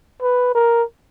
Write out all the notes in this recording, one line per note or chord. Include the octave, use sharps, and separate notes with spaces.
B4
A#4